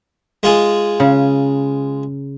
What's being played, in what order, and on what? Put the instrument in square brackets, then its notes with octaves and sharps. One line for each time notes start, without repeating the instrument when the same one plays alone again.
[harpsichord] G#3 F4 G#4
[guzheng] C#3